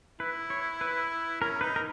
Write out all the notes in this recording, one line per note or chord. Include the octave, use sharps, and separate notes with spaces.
E4 B4
C#5
B4
C#4 A#4
D#4 B4
A#4